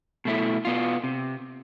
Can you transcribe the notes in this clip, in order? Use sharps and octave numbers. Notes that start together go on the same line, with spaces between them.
B2 A3 E4
B2 B3 F4
C3